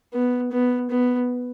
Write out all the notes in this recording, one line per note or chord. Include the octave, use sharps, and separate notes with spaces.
B3
B3
B3